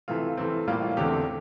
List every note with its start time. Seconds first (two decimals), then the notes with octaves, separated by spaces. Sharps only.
0.08 C3 E3 A3 F4
0.37 C3 E3 A3 C4
0.67 A2 G3 A#3 F4
0.82 F4
0.97 E2 D3 A3 C4 G4